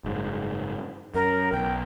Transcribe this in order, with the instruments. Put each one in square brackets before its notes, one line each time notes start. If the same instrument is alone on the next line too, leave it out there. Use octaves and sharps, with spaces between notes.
[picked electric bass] F#1 G#2
[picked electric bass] F#2 [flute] A#4
[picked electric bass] B1 [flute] G5